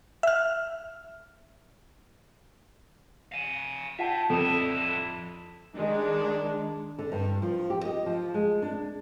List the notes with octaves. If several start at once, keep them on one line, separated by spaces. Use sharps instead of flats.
E5 F6
F5 G#5
F4 E5 F#5 G5 A5
F2 D3 E4 A4
D#3 G#3 D4
D3
G2
F3
G4
D#5
F3
G#3
D4